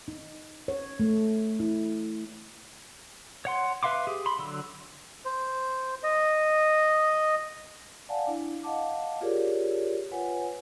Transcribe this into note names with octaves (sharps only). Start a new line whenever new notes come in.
D#4
C#5
A3
E4
C#5 F#5 C6
B4 E5 F5 C6 D6
G4 G#4
B5 C6
D3 F#3 E6
C5
D#5
D5 F5 F#5 G#5 A5
D4 E4
D#5 F5 F#5 A5 D6
F4 G4 G#4 A#4 C#5 D5
F4 B4 C#5 F#5 G#5